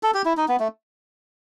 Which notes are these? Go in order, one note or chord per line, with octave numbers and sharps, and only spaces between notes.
A4
G4
E4
D#4
B3
A3